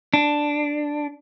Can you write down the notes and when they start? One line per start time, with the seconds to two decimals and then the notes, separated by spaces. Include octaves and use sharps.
0.14 D4